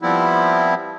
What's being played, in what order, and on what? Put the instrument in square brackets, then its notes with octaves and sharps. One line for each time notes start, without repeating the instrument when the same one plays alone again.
[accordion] F3 G3 B3 C4 E4